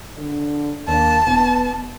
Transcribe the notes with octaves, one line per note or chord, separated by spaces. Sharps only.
D3 D4
D#2 A#3 D4 A5
E1 B3